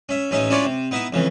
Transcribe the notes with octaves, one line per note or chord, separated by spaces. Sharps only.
C#4 E5
A1 C#4 D#4 E5
C#4 D4 E4 F4 C#5 D5
C3
B3 D#4 E4 E5
F2 C#3 E3